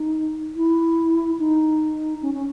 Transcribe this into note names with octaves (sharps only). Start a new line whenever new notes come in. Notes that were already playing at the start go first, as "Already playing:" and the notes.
Already playing: D#4
E4
D#4
C#4
C#4